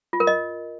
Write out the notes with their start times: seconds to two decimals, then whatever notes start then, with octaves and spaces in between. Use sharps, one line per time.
0.13 F4
0.20 A#4
0.27 D#5